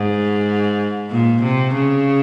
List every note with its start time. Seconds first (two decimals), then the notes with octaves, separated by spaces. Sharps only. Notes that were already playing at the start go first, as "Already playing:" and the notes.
Already playing: G#2
1.11 A#2
1.42 C3
1.74 C#3